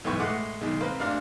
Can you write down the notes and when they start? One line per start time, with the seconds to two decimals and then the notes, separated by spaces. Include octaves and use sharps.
0.04 B1 G#2 E3 B3 G5 C#6
0.19 A2 G#3 F#5 D6 F#6
0.61 B1 D#3 G#3
0.81 A#3 C4 B4
0.99 A1 D4 F5 C6